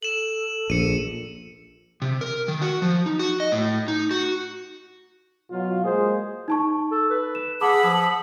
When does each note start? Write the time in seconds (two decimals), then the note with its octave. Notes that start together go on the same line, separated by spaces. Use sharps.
0.03 A4 E7 F#7
0.70 A#1 C#7 D#7
2.02 C3
2.21 A#4
2.48 D#3
2.61 F#4
2.82 F3
3.06 D#4
3.19 F#4
3.40 D#5
3.52 A2
3.88 D#4
4.11 F#4
5.51 B2 F#3 F4
5.84 G#3 A#3 G#4 C5
6.48 D#4 A5 C#6
6.91 A4
7.11 B4
7.35 E7
7.61 G#4 F#5 A5 B5 D6 E6
7.84 F3 D#6